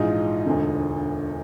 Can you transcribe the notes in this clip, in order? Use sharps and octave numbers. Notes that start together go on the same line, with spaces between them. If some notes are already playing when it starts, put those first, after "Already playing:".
Already playing: A#1 G#2 E3 G#3 D#4 F4
E1 D2 D3